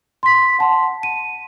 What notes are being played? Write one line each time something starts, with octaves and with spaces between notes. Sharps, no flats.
C6 B6
F#5 A5 C6
D#7